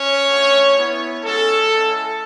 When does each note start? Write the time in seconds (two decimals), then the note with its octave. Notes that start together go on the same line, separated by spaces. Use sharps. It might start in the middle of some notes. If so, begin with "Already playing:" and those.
Already playing: C#4 C#5
0.29 A3 D4 F#4
0.76 B3 E4
1.23 G#3 C#4 F#4 A4
1.71 G#3 C#4 E4